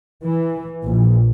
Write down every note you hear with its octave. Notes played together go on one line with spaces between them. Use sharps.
E3
A#1